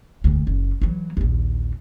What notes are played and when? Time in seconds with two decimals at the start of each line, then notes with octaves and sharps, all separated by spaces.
0.24 E1 D2
0.47 F#1
0.82 E3 F#3
1.17 A#1 D#2